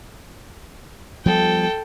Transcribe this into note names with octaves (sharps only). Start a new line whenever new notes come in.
F3 G3 B3 A4 G5